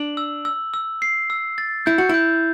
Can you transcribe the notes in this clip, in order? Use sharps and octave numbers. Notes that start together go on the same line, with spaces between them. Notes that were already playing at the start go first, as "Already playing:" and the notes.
Already playing: D4 F#7
E6
E6
E6
C7
E6
A6
E4 G6
F#4
E4 G6